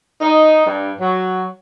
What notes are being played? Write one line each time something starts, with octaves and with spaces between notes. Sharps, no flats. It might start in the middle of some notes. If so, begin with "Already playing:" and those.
D#4
G2
F#3